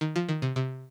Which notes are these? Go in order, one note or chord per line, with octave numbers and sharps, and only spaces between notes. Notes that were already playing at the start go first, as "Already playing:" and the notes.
D#3
F3
D#3
C3
C3